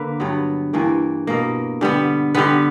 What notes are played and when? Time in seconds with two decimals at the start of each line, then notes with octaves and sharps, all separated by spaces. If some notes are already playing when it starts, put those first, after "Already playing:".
Already playing: D3 A#3 B4
0.20 G2 F#3 B3
0.73 G2 E3 A#3
1.27 B2 A#3
1.81 D3 G3 B3
2.35 D3 G3 B3 B4